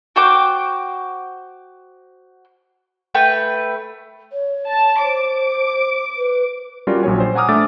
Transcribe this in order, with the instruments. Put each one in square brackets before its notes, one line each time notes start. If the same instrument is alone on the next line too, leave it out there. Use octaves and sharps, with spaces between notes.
[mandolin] F#4 C5 G5 D6
A3 B4 G5
[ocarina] C#5
[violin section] A5
[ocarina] C5 [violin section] D6
[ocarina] B4
[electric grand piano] G3 C#4 F4 F#4 A#4 D5
A#1 A#2 F#3 C#5 G#5
C5
F#5 G#5 A#5 D6 D#6 F6
A3 D4 E5 D6 E6 A6